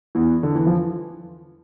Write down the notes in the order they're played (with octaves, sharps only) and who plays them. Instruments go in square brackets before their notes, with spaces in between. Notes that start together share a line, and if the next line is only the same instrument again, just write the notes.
[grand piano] E2 E3
D3
E3
F3